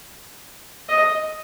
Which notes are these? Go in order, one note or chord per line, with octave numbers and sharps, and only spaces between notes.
D#5